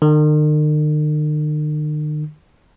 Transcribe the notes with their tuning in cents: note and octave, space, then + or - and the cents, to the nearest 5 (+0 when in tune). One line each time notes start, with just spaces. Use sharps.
D#3 -45